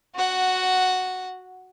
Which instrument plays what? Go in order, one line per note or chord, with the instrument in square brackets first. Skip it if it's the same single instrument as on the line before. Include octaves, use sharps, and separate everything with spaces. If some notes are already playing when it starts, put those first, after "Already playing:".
[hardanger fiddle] F#4 F#5